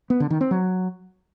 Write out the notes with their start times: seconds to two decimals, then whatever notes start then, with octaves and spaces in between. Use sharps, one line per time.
0.10 B3
0.20 D3
0.30 D#3
0.41 C4
0.51 F#3